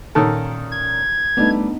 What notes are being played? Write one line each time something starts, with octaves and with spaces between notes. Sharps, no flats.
A#2 D#3 C#4 A4
G#6
G3 A3 B3 D4 D#4